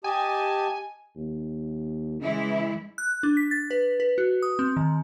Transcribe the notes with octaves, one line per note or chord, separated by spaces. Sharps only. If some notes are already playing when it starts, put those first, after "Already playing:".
G4 D#5 G#5 A5
D#2
C#3 E3 G#3 E4
F#6
D4
B6
A6
B4
B4
F#4
D#6
C4
D#3